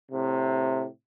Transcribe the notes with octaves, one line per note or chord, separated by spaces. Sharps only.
A2 C3